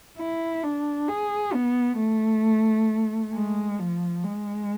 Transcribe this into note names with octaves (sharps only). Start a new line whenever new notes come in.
E4
D4
G#4
B3
A3
G#3
F3
G#3